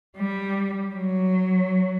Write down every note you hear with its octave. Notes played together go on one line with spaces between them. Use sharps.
G3
F#3